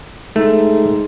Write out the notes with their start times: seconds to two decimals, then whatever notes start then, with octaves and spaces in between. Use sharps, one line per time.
0.36 G#2 A3